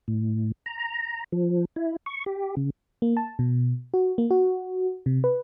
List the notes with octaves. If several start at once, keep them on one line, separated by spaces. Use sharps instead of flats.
A2
A#5
F3
E4
C#6
G4
C#3
A#3
A5
B2
F#4
A#3
F#4
C3
B4